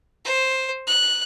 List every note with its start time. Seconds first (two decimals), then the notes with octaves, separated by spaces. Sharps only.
0.25 C5
0.87 F#6